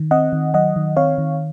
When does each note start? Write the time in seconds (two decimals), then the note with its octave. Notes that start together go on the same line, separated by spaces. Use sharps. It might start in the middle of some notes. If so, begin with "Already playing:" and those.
Already playing: D#3
0.11 C4 D#5 F#5
0.33 D#3
0.54 F#3 D#5 F#5
0.76 D#3
0.97 C4 C#5 F5
1.18 D#3